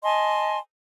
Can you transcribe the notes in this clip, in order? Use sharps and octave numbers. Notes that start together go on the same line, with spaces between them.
D#5 G#5 A5 C6